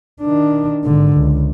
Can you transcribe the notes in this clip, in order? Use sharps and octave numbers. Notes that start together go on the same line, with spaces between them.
D#3 D4
G#1 D3
C#2